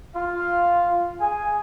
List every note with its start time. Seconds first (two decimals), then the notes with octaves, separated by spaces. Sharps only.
0.15 F4 F5
1.20 G#4 G#5